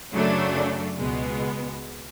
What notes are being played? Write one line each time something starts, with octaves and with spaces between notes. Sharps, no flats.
F#2 C#3 F#3 A3 D4
C#2 B2 G#3 B3